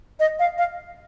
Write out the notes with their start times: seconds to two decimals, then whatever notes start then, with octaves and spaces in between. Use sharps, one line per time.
0.20 D#5
0.39 F5
0.58 F5